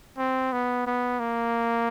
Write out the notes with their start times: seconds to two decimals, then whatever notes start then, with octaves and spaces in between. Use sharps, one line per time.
0.18 C4
0.53 B3
0.87 B3
1.20 A#3